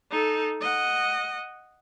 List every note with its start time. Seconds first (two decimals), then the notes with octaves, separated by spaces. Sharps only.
0.11 D#4 A4
0.61 D#5 F#5